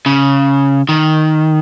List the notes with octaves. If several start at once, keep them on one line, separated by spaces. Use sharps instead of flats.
C#3
D#3